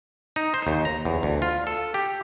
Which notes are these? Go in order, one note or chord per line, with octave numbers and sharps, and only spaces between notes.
D#4
C5
D#2
A#5
E2
D2
F4
A4
G4